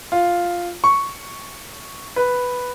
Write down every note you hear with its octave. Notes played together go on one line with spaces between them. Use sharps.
F4
C#6
B4